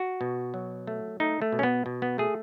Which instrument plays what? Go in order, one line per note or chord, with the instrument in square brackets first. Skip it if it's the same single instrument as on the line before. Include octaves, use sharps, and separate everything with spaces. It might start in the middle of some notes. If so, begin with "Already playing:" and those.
Already playing: [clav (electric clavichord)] F#4
B2
F#3
A3
A3 D#4
A3
B2
C#4
B3
B2
B3
A3 G#4